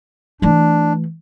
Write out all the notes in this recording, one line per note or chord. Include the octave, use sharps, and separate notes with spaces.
E3 A3 D4